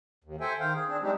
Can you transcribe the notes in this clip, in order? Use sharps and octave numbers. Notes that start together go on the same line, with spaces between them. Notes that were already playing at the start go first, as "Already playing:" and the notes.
D#2
A4 C5 E5 G5 G#5
D#3 C5 F5 G5
G#4
C4 D4 G#4
G3 G#3 C4 D4 D#4 G4